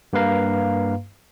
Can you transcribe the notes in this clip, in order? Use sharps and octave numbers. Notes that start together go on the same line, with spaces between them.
G2 A#3 B4 F5 A#5